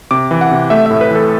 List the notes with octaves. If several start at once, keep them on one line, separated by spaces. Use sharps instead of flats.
C3 D6
E3
F#5
C3
A3 E5
A2 E5
B4
E3 A4